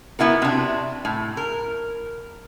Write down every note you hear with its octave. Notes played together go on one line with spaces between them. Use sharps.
B3 E4 F#4 A#4
C3 D4
A2
A#4